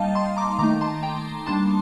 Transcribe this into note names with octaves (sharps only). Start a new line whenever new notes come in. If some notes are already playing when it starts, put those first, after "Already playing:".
Already playing: G3 A#3 D#4 D#5 F5 G5 A5
A5 C6
A#5 D6
D#3 A3 D#4 A#5 D6
A5 C6
G5 A#5
G3 A#3 D4 A5 C6